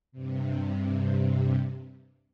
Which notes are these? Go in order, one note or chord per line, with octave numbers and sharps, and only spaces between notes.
G2 C3